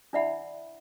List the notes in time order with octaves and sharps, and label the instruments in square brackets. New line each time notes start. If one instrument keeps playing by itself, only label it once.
[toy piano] D4 E4 D5 E5 F#5 B5